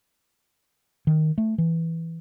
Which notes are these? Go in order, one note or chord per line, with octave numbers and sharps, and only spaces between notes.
D#3
A3
E3